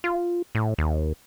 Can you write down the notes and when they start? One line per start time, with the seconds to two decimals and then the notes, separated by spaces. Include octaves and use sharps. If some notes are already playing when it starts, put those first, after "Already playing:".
0.04 F4
0.55 A2
0.78 D#2